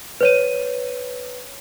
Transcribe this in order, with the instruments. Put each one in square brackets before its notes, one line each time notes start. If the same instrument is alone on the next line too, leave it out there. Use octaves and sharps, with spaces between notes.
[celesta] B4 C#5 D#7